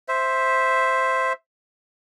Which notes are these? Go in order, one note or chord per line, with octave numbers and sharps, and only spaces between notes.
C5 E5